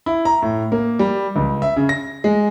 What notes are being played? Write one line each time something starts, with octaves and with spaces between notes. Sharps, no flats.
E4
A#5
A2
A#3
G3
C#2
E5
C#3
A#6
G#3